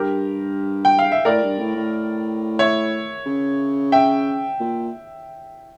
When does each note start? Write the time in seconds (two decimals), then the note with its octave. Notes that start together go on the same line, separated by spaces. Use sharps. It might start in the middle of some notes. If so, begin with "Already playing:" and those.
Already playing: G2 G4 A#4
0.85 G5
0.99 F5
1.12 E5
1.25 A2 A#4 D5
1.42 G2
1.59 A2
1.76 A2
2.59 C#5 E5
3.26 C#3
3.92 E5 G5
4.60 A#2